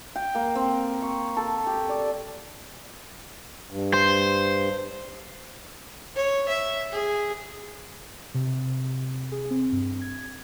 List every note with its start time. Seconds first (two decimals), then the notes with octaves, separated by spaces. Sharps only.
0.16 G5
0.35 A#3
0.55 C4
1.02 C#6
1.37 A4
1.67 G4
1.89 D5
3.71 G2
3.94 C5
6.16 C#5
6.49 E5
6.92 G#4
8.34 C3
9.32 G#4
9.50 C4
9.72 G2
10.01 G#6